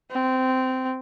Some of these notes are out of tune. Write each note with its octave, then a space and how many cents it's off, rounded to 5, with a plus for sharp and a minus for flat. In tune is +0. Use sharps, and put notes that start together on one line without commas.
C4 -15